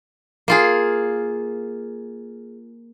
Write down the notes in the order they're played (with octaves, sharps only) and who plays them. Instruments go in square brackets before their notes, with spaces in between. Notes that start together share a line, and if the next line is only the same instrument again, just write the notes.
[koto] A#3 F4 G#4